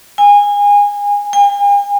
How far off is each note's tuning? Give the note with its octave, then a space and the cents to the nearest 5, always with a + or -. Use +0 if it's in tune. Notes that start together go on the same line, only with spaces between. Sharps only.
G#5 -25
G#5 -45